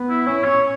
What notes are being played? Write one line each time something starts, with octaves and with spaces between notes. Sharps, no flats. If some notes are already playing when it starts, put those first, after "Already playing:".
Already playing: B3
E4
C#4 E4
C#5